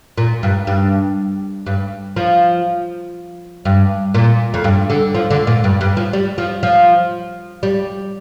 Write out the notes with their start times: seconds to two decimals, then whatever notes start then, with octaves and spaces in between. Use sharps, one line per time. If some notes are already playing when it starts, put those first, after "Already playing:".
0.18 A#2
0.43 G2
0.67 G2
1.66 G2
2.16 F3
3.65 G2
4.14 A#2
4.54 F2
4.64 G2
4.90 D3
5.15 F3
5.30 D3
5.47 A#2
5.64 G2
5.81 G2
5.97 F3
6.13 G3
6.38 F3
6.63 F3
7.63 G3